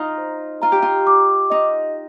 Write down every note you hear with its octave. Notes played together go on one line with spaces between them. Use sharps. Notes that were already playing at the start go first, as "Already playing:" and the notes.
Already playing: D#4 F4 A#5
C5
F4 A#5
G4
F4
D6
D#4 D#5